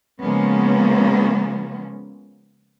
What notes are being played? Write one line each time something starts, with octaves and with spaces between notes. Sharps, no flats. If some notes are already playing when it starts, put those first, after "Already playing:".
C#3 F3 G#3 A#3 B3 C#4